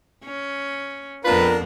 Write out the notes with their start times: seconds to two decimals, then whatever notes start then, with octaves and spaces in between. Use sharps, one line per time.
0.24 C#4
1.24 F2 B3 C4 D4 F4 A#4 B4